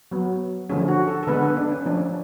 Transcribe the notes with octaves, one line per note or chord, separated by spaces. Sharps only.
F#3 B3
D3 F3 A3 C#4 G#4
F#4
A4
A4
D3 G#3 B3 B4
B4
D4
C#4
F3 A3 C#4 D4